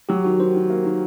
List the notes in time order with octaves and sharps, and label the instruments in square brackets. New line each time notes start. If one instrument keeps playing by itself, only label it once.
[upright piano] F#3 [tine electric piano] G4
[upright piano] D#3 [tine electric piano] F#4
[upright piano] D#3 [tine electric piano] C5
[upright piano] D#3
A#3
D#3